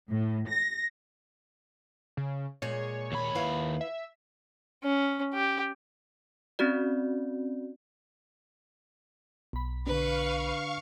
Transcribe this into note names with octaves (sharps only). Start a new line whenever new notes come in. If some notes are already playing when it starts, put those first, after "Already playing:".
A2
A#6
C#3
A#2 G#3 G#4 C#5
D#2 B5
E4 B4 F5
E5
C#4
G4
C4 C#4 F#4 D5
B1 B5
D3 D4 B4 F5 C#6